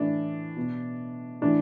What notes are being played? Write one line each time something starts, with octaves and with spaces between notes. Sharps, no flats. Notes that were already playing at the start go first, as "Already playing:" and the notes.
Already playing: A2 E3 D4
B2
A2 E3 D4